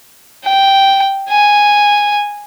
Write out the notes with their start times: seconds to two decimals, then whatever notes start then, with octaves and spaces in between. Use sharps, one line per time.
0.45 G5
1.29 G#5